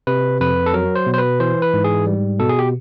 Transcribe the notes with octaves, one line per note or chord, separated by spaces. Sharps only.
C3 B4
F2 B4
A4
F#3 A#4
C5
B2
C5
B4
E3 C5
B4
G#2
G#4
G3
B2 A4
G#4
G4